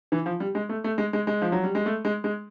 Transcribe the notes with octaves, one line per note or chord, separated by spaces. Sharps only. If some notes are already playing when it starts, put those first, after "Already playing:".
E3
F3
G3
G#3
A3
A3
G#3
G#3
G#3
F3
F#3
G3
G#3
A3
G#3
G#3